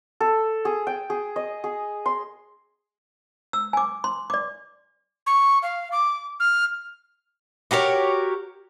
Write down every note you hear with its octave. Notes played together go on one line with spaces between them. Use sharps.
A4
G#4
G5
G#4
D#5
G#4
C6
E6
G#5 D6
C6
D5 D6
C#6
F5
D6
F6
F#4 G4 A#4 C#5